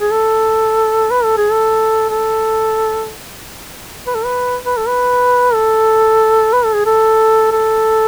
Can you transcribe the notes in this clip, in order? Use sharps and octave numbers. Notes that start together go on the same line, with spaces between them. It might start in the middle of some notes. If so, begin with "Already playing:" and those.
G#4
A4
B4
A4
G#4
A4
A4
B4
A4
B4
B4
A4
B4
A4
B4
A4
G#4
A4
A4